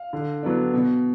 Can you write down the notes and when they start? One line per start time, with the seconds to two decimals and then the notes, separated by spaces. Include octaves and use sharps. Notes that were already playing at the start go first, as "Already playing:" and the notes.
Already playing: F5
0.13 D3
0.43 F#3 B3 D4
0.73 B2